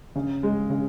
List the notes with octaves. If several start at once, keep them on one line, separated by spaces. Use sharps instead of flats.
C#3
G#3
C#3